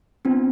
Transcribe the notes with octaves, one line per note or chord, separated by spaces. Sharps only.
B3 C4 D4 F4